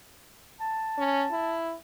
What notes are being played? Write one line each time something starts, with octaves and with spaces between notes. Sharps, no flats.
A5
C#4
E4